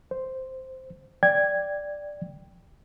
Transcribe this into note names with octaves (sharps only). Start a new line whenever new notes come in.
C5
D5 G5 G#6